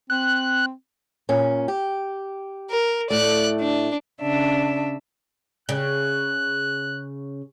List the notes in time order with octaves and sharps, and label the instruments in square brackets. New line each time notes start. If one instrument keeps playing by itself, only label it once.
[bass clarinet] C4 [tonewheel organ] F#6
[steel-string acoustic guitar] A#2 C#4
G4
[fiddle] A#4
[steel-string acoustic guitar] A2 A3 [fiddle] D5 F#6
[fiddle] D4
[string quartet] C#3 D4 E5
[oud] C#3 [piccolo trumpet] F#6